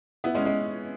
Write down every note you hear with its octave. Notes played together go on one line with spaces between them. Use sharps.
B3 E4
G#3 C#4
G#3 C#4